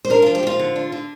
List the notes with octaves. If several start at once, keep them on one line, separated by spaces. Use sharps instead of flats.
C5
D4 A#4
F4
F3
G4
F3 F4
D3
D4
D3